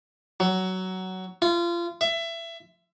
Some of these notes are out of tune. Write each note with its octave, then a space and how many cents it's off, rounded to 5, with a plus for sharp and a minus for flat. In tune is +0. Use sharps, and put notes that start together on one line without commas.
F#3 +15
F4 -30
E5 +20